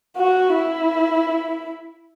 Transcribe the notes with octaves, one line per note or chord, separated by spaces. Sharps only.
F#4
E4